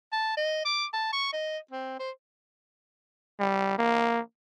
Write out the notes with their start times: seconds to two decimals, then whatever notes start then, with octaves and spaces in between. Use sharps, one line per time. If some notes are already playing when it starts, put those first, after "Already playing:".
0.13 A5
0.37 D#5
0.65 D6
0.93 A5
1.13 C#6
1.33 D#5
1.71 C4
1.99 C5
3.40 G3
3.79 A#3